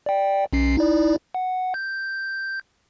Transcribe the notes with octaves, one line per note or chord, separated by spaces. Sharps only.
D5 G5
B1 C#4 C7
D#4 E4 D5
F#5
G6